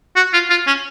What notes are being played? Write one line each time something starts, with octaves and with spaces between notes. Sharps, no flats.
F#4
F4
F4
C#4